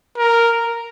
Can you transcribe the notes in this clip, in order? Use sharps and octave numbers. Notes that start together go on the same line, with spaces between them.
A#4